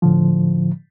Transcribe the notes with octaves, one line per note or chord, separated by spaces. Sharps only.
A2 D3 F3